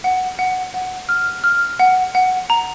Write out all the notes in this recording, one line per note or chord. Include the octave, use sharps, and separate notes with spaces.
F#5
F#5
F#5
F6
F6
F#5
F#5
A#5